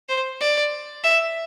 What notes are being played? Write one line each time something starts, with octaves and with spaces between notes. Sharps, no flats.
C5
D5
E5